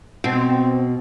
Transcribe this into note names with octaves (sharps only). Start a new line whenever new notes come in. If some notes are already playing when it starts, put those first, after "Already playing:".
B2 C4